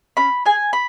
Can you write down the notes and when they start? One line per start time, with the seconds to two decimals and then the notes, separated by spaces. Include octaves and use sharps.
0.17 C#4 B5
0.45 G#4 G#5
0.73 B5